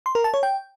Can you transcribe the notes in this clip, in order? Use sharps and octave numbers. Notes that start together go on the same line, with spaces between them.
C6
A#4
A5
C#5
G5